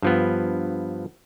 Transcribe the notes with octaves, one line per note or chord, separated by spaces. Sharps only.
G2 F3 B3